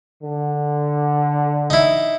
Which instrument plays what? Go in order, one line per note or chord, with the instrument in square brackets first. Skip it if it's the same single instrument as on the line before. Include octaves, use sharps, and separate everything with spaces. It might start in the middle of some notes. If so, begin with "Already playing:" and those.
[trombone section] D3
[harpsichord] D#4 E4